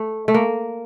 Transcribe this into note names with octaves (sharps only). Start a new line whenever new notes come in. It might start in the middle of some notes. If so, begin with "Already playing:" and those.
Already playing: A3
A3
A#3